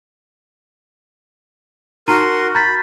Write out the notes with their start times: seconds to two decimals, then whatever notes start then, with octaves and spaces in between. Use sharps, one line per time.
2.08 D#4 F#4 A#4 A#5 C6 D#7
2.55 A#5 B5 G6 A6 B6